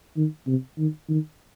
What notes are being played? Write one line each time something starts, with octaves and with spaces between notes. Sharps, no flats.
D#3
C3
D#3
D#3